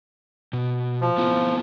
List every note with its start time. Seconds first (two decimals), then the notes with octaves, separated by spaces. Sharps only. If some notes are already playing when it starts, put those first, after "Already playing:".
0.53 B2
1.01 F3
1.18 B3 E4 F4